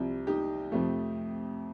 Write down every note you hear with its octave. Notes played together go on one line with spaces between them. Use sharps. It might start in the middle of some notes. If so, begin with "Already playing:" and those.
Already playing: C2 C3 F3
D#4 G4
F2 C3 F3 A3